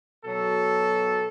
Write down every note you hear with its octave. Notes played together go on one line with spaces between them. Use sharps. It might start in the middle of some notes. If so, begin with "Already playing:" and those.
B2 F#3 A4